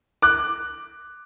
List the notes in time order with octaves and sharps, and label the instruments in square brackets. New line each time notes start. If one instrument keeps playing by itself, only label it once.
[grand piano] D6 F#6